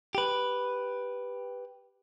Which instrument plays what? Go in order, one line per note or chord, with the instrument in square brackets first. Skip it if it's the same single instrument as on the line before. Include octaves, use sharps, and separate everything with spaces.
[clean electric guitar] G4 B4